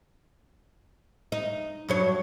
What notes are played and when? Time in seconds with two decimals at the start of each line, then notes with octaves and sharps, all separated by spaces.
1.32 D#4
1.89 G2 F#3 C#5